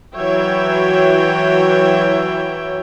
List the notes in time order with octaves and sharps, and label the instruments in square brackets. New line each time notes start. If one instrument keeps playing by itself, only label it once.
[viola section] E3 F#3 C#5 E5 G5